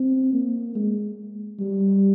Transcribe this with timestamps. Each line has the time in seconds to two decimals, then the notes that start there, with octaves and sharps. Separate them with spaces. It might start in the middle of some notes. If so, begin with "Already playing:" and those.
Already playing: C4
0.33 A#3
0.75 G#3
1.60 G3